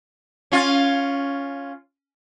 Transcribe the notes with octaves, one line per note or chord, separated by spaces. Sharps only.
C#4 F4